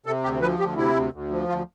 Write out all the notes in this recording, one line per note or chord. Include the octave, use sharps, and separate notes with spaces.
C3 A4
D2 G4
F3 B4
D2 G4
C3 E4
D2
D2
F3
D2 F4